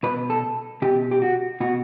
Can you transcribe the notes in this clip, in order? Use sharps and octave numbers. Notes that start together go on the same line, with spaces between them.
B2 B4
A4
B2 G4
G4
F#4
B2 F#4